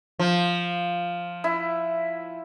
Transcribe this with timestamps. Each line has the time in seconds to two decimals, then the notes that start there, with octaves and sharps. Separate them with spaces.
0.19 F3
1.44 E4